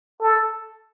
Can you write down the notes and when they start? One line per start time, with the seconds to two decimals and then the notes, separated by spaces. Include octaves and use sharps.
0.22 A4